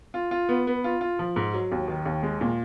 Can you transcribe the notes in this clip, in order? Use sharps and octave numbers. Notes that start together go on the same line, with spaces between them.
F4
F4
B3
B3
F4
F4
F3
G#2
F#3
D#2
D#3
D#2
G#3
A#2